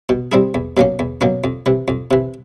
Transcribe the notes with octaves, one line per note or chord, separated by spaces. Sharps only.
B2
G3 C4 E4 G#4
E2
B2 F#3 A#3 C#4
E2
B2 F#3 A#3 C#4
F2
C3 E3
F2
C3 E3